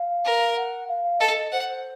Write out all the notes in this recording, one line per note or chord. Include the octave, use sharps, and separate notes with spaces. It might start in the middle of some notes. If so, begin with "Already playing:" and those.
Already playing: F5
A#4
F#5
F5
F5
A4 D#5
C5 F#5